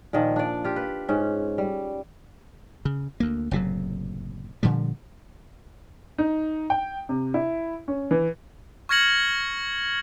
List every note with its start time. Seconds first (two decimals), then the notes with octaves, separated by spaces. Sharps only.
0.13 A#2 D#3 F3
0.36 D4 D5
0.64 F4 G4
0.76 B4
1.09 G#2 C#4
1.58 G3
2.85 C#3
3.20 D2 A#3
3.51 F#1 A2 C3 F#3
4.63 A#2 D3 F3 G3
6.18 D#4
6.70 G5
7.09 C3
7.34 E4
7.88 C#4
8.11 E3
8.89 C#6 F6 G#6 A#6 C#7 F#7